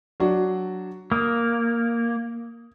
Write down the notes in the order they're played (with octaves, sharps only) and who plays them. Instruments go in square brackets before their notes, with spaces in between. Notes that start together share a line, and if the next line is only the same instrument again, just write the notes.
[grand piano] F#3 D4 F#4
[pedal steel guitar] A#3 [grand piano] D#6